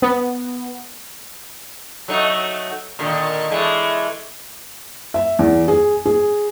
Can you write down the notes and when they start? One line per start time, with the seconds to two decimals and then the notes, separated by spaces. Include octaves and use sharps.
0.02 B3
2.08 F#3 A3 D#4
2.99 A#2 D3 D#3
3.51 E3 G#3 A3
5.14 E5
5.39 E2
5.68 G#4
6.06 G#4